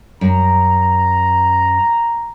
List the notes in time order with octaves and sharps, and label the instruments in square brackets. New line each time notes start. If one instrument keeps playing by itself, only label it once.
[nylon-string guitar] F#2 [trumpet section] A#5